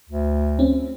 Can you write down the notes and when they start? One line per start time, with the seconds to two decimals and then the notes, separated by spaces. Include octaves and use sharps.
0.09 D2
0.59 C4 C#4